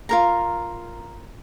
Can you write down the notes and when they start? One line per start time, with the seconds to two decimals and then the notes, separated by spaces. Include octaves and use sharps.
0.09 F4 A#4 A#5